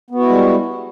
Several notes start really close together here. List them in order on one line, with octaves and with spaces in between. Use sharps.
B3 F#4 E4 G#3 G3